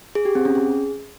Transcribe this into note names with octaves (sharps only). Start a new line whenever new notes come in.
G#4
G4
C4
C#4
G#4